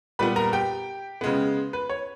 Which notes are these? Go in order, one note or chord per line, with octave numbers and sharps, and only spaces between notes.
A#2 G3 B3 B4 B5
A#4 A#5
G4 G5
C#3 G#3 B3
B4
C#5